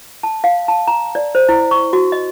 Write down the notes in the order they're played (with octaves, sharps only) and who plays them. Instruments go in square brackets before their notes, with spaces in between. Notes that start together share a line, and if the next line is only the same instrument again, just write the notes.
[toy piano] A5
F5
A5
A#5
D5
C5
E4
C#6
F#4
D#5